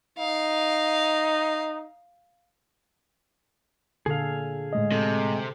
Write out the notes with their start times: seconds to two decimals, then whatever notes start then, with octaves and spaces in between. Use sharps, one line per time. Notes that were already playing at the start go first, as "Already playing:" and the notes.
0.18 D#4 F5
4.06 A#2 D3 G#4 A4 F5
4.73 A2 G#3 D#5
4.92 C3 A4